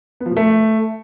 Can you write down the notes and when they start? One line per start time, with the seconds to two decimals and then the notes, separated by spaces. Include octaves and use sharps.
0.20 B3
0.26 F3
0.31 B2
0.37 A3